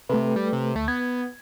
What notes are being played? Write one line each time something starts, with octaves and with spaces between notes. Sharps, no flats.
C3 A3 A4 B4
G3
C3
D2 A3
B3 G#6